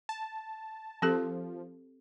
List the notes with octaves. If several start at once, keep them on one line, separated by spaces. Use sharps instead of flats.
A5
F3 C4 G4 A4